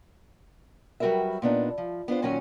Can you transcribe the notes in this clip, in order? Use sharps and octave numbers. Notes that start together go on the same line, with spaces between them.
F#3 G3 F#4 A#4 B4 E5
A#2 B3 D4 D#4
F3
B3 D4 F4 C5
A#2 D#3 F#3 C#4 C#5 G#5